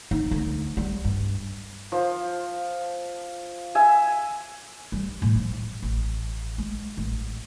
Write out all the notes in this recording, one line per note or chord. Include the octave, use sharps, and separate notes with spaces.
D#4
D2
G3
G2
F3
E5 G#5
G3
A2
F3
A1
G#3
A1